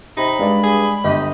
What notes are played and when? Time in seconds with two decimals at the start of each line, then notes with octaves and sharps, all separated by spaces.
0.17 C3 D#4 B5
0.39 G2 G#3 D5
0.64 G#4
1.04 G1 G4 D#5